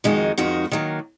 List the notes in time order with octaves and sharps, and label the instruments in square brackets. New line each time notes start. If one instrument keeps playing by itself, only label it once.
[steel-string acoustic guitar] F2 D#3 G#3 D#4 F#4
F2 D#3 G#3 D#4 F#4
D#3 F#3 A#3